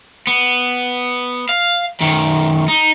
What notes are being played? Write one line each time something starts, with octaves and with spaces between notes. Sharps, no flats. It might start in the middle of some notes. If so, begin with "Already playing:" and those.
B3
F5
F#2 D#3
D#4